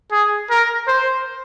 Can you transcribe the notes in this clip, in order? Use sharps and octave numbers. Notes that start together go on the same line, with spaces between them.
G#4
A#4
C5